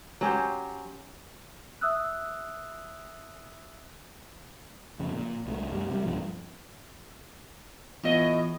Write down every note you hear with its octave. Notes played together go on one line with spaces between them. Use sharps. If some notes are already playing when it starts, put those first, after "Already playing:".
F#3 C#4 G4 C5
E5 D#6 E6 F#6
F2 C#3
A#2
C2 F3 A3
F#2 G3
C3 G3
B1 G2 F3
A2 E3 B3 F4 D#5